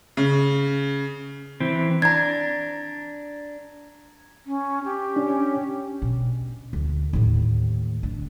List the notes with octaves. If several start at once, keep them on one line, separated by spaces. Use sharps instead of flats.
C#3
E3 C4
D4 A#5 G#6
C#4
G4
C#4 D4
B2
D2
D#2 A2
D3